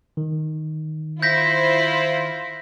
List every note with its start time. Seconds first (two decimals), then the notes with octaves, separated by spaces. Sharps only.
0.17 D#3
1.22 E4 F4 C5 G6 A#6 B6